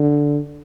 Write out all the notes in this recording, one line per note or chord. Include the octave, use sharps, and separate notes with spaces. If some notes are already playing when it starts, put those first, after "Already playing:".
Already playing: D3